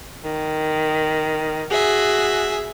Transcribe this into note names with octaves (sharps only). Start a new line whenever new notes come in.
D#3
F#4 G#4 E5